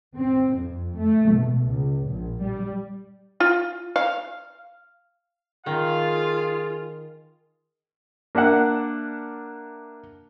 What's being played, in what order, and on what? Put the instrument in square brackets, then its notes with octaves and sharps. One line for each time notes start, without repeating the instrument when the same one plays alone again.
[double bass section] C4
F2
A3
B2
C#2
A#1
G3
[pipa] F4
F5
[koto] D#3 [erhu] F4 [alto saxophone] G#4 [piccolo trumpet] F5
[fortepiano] A#3 D4 E5 F#5